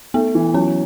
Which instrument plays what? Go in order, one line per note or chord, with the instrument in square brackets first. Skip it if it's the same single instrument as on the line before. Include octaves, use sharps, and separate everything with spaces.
[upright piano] A3 [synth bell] B3
[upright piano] E3
[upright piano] F#3 [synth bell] C#4